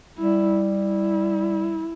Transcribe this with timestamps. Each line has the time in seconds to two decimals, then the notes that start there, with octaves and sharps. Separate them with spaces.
0.18 G3 E4
0.60 E4